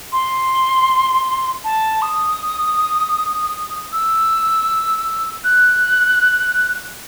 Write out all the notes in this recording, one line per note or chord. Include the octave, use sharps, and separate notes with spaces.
C6
A5
D#6
E6
F#6